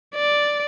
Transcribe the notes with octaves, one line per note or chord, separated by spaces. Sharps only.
D5